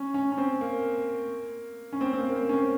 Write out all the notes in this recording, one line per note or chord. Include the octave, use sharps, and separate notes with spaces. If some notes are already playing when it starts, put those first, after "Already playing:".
Already playing: C#4
C#4
C#4
C4
A#3
C#4
C4
C4
A#3
A#3
C4
C#4
C4